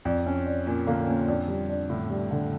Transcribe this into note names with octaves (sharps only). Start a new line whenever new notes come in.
F2 D5
C#4
D5
A#2 C#4
D3 A#3
A#2 C#4
F2 D4
G3
D4
A2 D3
G3
D3